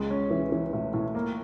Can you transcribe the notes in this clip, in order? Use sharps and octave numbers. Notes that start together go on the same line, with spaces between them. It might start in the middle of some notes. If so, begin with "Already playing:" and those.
Already playing: C#2 G#3
C#4
E3
E3
A2
A2
A#3